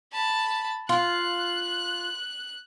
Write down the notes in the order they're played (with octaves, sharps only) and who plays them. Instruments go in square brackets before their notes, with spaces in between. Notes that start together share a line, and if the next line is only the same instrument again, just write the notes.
[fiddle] A5 B5
[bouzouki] F4 [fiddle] F#6